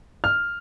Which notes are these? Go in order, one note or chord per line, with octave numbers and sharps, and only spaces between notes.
F6